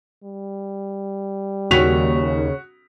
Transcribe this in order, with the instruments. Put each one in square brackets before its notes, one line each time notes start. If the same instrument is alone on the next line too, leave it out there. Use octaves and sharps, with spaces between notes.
[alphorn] G3
[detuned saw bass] D#2 [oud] C#3 [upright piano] F#4 B6 F7